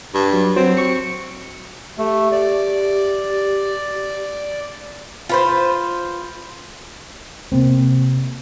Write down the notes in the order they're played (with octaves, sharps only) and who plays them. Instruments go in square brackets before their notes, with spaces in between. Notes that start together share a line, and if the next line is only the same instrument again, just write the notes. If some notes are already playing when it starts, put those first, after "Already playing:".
[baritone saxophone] G2
[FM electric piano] F#3
[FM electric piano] F#3 C5 [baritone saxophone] C4
[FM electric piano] C#6 C#7
[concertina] A3 [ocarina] G4
[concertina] D5
[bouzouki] F4 B4 C5
[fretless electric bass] C3 A#3 C4